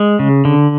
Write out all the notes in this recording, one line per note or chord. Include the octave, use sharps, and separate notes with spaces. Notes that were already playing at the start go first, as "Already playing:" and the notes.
Already playing: G#3
C#3
D3